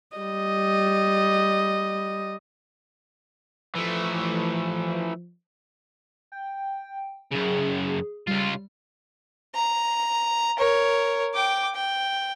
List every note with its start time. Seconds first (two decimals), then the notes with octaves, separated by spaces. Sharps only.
0.17 G3 D#5
3.75 E3 F3 A3
6.32 G5
7.31 F#2 C#3 G#4
8.27 C#2 G3 F4
9.55 A#5
10.58 A#4 C#5
11.34 G5 D6
11.75 G5